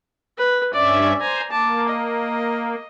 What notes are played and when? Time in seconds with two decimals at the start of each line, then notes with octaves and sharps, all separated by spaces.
0.38 B4
0.74 G2 C#4 D5 E5
1.20 C5 G#5 A#5
1.51 A#3 A5 D6
1.89 D#5